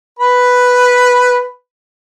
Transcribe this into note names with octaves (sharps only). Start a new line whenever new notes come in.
B4 B5